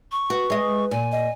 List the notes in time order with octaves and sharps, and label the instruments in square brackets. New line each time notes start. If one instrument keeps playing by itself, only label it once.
[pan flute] C#6
[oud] F#4 [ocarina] B4
[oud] G#3 D#5
[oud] A#2 [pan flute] G#5
[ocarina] D#5